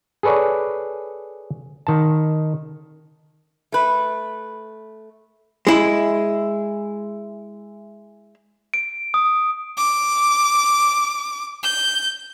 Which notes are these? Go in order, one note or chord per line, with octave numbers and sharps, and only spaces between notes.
G#4 A4 B4 C#5 D5
D#3 A5
A3 B4
G#3 E4
D7
D#6
D6
G6